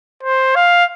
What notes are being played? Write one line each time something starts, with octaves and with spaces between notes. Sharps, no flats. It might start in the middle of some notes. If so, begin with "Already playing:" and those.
C5
F5